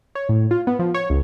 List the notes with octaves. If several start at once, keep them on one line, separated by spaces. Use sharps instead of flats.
C#5
A2
F4
B3
F3
C#5
C#2